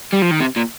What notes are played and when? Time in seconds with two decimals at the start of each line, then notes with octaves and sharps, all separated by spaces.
0.12 G3
0.22 F3
0.31 D#3
0.40 C3
0.56 A#2